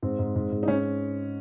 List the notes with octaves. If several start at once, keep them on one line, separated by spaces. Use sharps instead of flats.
G#2 C4
G#2
G#2
G#2
D#4
C#4